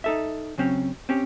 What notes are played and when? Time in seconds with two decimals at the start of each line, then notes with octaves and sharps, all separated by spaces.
0.04 D#4 A4 E5
0.58 C#3 F#3 C4 C#4
1.09 C4 C#4 G4